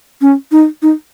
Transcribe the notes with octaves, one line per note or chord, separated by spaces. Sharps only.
C#4
D#4
D#4